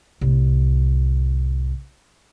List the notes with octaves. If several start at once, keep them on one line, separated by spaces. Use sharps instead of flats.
C2 A2